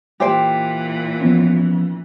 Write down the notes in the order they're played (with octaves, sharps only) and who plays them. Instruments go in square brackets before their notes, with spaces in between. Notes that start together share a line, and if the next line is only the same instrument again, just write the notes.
[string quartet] A#2 E3 [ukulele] G4 C5 G5
[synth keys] F3 B3 C#4